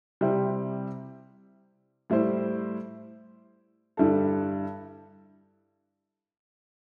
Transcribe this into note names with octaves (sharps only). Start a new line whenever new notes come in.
C3 G3 C4 E4 G4
A2 G3 E4 C5
G2 D3 G3 E4 A4